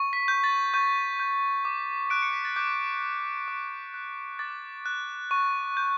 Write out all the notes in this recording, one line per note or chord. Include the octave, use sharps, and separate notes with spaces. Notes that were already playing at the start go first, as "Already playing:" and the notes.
Already playing: C#6
B6
G6
A6
C#6 G6
G6
D6
F#6 D7
C#7
B6
A6
D6 G6
F#6
D6
F#6
D6 A6
F#6
C#6
G6